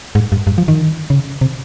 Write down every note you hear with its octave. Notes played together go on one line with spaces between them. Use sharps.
G#2
G2
G2
F3
D#3
C#3
C3